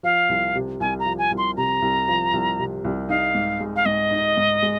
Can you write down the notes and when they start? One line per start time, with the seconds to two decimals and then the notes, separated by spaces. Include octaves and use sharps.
0.03 F3 F5
0.29 C2
0.55 C3
0.80 C2 G#5
0.99 A#5
1.05 F3
1.18 G#5
1.31 C2
1.38 C6
1.57 C3 A#5
1.82 C2
2.08 F3
2.33 C2
2.59 C3
2.84 C2
3.09 D#4 F5
3.35 G#2
3.60 G#3
3.76 F5
3.85 G#2 D#5
4.11 D#4
4.37 G#2
4.62 G#3